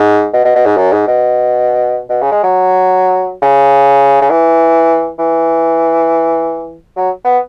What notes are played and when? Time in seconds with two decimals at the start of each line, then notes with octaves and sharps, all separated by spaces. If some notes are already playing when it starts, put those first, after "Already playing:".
Already playing: G#2
0.33 B2
0.45 B2
0.55 B2
0.66 G#2
0.77 F#2
0.93 G#2
1.07 B2
2.09 B2
2.21 C#3
2.31 G#3
2.43 F#3
3.42 C#3
4.21 C#3
4.30 E3
5.18 E3
6.96 F#3
7.25 B3